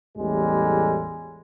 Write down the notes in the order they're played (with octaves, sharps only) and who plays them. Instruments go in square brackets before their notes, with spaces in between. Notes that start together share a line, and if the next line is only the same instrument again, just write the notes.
[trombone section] A1 E2 A2 E3 G3 G#3